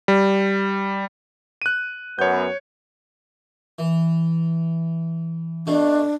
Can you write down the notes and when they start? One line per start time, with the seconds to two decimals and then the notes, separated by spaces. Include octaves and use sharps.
0.08 G3
1.62 F#6 D#7
2.19 F#2 B3 C#5 G6
3.79 E3
5.67 B2 A3 D4